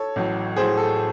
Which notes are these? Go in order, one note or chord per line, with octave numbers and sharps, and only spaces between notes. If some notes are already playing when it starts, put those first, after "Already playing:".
Already playing: A4 C#5
A1 A2 F#3
A1 A2 F#3 G#4 C5
A4